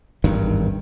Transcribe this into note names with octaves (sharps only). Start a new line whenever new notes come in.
G#1 E2 G2 D#3